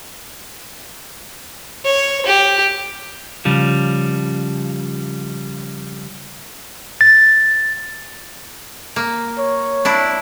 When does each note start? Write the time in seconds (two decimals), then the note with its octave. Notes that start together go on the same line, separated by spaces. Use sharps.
1.85 C#5
2.27 G4
3.45 C#3 F3 G3
7.01 A6
8.96 A#3
9.39 C#5
9.85 D4 E4 D5